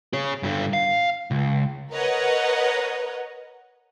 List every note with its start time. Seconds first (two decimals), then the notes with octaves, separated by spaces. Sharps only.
0.13 G#4 C#5
0.43 G2 D3
0.73 F5
1.31 C#2
1.91 A#4 B4 C#5 D#5 F#5